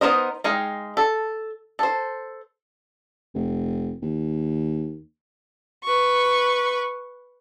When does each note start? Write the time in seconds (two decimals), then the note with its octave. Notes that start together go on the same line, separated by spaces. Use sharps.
0.01 B3 D#4 A#4 C5 D#5
0.44 G#3 D#4 F5 G5
0.97 A4
1.79 A4 C5
3.34 F1
4.02 D#2
5.84 B4 C#6